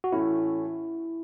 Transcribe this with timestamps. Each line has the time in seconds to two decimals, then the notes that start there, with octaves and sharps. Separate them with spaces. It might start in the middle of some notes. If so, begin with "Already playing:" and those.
0.04 F#4
0.13 A2 E3 A3 C#4 E4